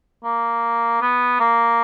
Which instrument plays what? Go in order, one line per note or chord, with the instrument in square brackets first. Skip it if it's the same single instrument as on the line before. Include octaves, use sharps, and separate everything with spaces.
[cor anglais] A#3
B3
A#3